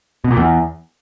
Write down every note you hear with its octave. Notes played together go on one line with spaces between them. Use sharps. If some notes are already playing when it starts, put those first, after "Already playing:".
B2
A#2
E2